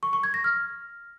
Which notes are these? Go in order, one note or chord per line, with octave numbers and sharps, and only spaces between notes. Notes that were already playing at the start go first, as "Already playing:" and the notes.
C#6
C#6
G#6
A#6
F6